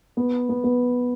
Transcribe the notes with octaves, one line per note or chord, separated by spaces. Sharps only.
B3
B3
B3